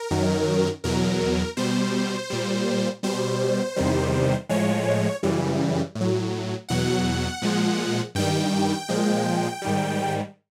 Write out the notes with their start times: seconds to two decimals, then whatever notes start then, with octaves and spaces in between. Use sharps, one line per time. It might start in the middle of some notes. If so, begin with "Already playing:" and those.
Already playing: A#4
0.11 F#2 D#3 F#3
0.84 E2 B2 F#3 A#4
1.57 B2 G3 C5
2.30 A#2 G3
3.03 B2 G3 C5
3.76 E2 C3 D#3 G3
4.49 A2 F3 G#3 C#5
5.23 F#2 C#3 E3 G3
5.95 A2
6.01 F#3
6.69 E2 B2 F#3 F#5
7.42 A#2 F3 G#3
8.15 G2 D#3 G3 G5
8.89 A#2 F3 G#3
9.62 G#2 D#3 G3